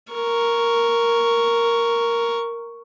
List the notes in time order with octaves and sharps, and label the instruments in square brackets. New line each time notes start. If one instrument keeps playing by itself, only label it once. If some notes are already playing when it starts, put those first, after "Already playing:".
[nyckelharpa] A#4 C#6